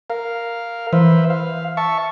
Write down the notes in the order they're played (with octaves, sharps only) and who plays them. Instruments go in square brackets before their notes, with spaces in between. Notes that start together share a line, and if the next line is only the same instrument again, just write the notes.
[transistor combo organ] A#4 F5
[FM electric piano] E3 [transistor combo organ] B4 C5 E5
[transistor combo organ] F5
E5 A5 C#6